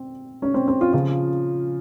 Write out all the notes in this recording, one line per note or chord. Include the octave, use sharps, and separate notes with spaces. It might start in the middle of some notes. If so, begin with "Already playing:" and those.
Already playing: C4
C#4
C4
C4
F4
C#3 F3 F4